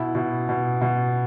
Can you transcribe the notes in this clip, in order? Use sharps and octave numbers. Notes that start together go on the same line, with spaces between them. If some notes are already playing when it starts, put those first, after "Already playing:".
Already playing: B2 E4
B2
B2
B2